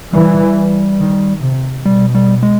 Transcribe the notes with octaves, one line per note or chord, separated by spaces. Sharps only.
E3 G3
D#3
C3
B2 G3
G3
G#3